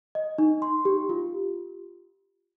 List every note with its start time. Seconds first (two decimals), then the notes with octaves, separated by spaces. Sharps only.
0.15 D#5
0.38 D#4
0.62 C6
0.85 G4
1.09 F4